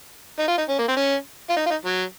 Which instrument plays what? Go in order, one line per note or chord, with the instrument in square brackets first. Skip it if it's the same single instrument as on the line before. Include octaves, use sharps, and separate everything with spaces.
[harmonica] D#4
F4
D#4
C#4
A#3
C4
C#4
F4
D#4
F4
D#4
F#3